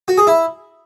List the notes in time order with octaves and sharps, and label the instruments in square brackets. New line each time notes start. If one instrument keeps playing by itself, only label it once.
[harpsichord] F#4
G#4
E4